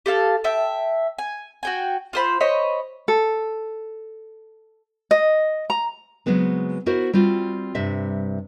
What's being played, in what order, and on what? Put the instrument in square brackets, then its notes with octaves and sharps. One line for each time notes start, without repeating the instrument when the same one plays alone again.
[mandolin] G4 A4 F5 A5
E5 G5 A5
G#5
F#4 G5 G#5
F4 C5 B5
C5 C#5 D#5 B5
[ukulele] A4
D#5
A#5
[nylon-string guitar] C#3 F#3 G#3 B3 C4
B3 E4 F#4 A#4 C5
G3 C4 F4 F#4
G2 C3 G3 E5